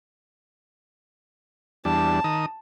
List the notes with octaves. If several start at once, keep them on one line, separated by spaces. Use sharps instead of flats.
E2 G3 D4 A5
D#3 A#5 D#6